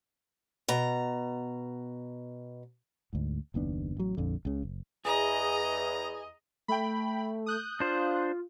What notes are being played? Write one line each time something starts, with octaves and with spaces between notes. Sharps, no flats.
B2 A#5
D2 G#2
F#1 D#2 B3 D4
A1 F#3
A#1 F2 D3
C#2 C#3
F#1
E2 G#4 D#5 A#5
A3 G5 B5
D#6 F#6 G6
D4 F4 C5